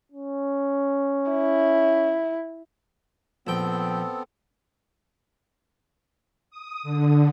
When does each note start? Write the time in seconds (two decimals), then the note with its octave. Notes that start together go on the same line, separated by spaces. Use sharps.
0.12 C#4
1.31 E4
3.47 A#1 B3 C4 A4 G5
6.51 D#6
6.83 D3